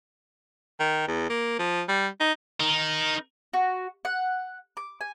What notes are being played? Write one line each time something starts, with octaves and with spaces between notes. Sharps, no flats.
D#3
E2
A#3
F3
G3
D#4
D#4 A#4
F#4
F#5
D6
G#5